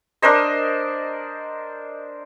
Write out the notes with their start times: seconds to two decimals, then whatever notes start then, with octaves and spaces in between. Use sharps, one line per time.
0.22 D4 A#4 C5 D#5